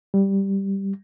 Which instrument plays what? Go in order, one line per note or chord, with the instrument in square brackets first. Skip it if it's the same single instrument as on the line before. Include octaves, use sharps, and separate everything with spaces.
[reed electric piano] G3